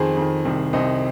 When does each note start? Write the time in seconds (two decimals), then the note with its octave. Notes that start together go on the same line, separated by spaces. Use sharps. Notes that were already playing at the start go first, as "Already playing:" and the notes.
Already playing: F2 D#3 G#4 C5
0.17 F2 D#3
0.45 C2 C3 D#3
0.73 C2 C3 D#3 C5 D#5